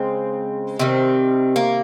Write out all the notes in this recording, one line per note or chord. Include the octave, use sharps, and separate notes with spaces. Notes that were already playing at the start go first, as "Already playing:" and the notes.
Already playing: C#3 G#3 C4
C3 D#3 G3 C4
A#3